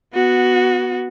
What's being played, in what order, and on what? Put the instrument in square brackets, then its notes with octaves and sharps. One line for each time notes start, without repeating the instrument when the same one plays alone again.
[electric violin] B3 F#4